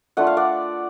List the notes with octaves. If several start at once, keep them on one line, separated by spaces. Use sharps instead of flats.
A3 D4 F4 F#5
F5
D5 F#5